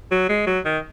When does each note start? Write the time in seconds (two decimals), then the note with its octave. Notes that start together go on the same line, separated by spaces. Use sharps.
0.11 F#3
0.29 G#3
0.47 F#3
0.65 D#3